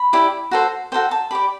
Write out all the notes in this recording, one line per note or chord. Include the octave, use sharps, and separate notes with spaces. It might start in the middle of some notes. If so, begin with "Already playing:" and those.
Already playing: B5
E4 G4 D5
F#4 A4 C5
F#4 A4 C5 G5
A5
G4 D5 B5